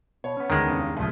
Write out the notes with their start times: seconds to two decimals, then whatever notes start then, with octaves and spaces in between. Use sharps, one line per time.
0.24 B2 C#5
0.37 B3 C#4
0.50 D2 D#3 G#3 A#4
0.66 E2 G2 C#3
0.97 D1 C2 F3 G#3 A3